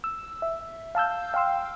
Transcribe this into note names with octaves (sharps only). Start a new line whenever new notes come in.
E6
E5
F5 A5 E6 G6
F5 G5 C6 E6